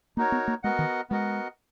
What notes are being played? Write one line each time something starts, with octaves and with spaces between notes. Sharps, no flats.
A#3 D#4 F#4 A#4 C#5
B3
A#3
G#3 B3 F#4 A#4 D#5 F#5
D#3
G#3 B3 F#4 A#4 D#5 F#5